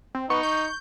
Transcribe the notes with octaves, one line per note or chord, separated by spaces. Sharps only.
C4
B3 D#4 C#6
G6